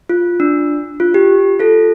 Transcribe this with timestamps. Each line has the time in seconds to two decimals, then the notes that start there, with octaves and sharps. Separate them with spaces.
0.09 F4
0.40 D4
1.00 F4
1.14 G4
1.59 F4 A4